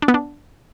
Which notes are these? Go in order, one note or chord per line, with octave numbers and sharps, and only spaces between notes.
D4
B3
D4